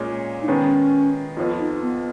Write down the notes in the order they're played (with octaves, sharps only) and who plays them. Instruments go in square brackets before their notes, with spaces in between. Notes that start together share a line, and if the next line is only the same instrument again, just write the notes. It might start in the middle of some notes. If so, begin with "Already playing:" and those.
Already playing: [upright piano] A#2 G#3 C#4
[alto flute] D#4
[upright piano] D#3 G#3 B3 [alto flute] C#4
[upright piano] F2 F3 B3 [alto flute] F4
[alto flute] D#4
B3